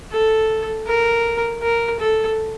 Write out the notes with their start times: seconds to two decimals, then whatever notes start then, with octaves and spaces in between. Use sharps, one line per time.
0.12 A4
0.88 A#4
1.62 A#4
2.00 A4